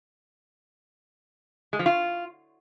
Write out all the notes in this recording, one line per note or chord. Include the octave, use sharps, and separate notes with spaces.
G#3
F3
F4